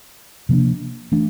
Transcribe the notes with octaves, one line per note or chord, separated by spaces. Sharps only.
C3 F3 A#3 D4
E3 A3 D4